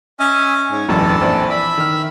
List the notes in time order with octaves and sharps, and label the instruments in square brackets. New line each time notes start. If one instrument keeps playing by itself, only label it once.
[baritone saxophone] C#4 [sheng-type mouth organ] D#5 E5 G#5
[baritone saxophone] G#2 [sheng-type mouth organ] C#5
[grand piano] E1 A1 F#2 [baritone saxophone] E3 [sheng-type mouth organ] D4 A4 A5
[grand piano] A#1 C4 D5
[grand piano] D5 [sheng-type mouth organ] E5 B5
[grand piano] D#3 F6